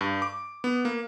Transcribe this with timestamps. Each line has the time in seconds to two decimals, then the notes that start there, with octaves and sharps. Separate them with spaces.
0.01 G2
0.22 D6
0.64 B3
0.85 A#3